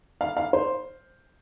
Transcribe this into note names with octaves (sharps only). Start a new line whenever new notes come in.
F5
F5
C5